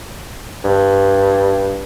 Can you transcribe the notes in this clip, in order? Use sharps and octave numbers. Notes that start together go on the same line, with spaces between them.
G2